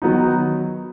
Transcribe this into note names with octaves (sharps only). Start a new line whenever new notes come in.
D#3 F#3 B3 D#4